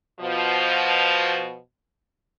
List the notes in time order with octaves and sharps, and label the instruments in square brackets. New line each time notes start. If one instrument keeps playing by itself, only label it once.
[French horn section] B2 F3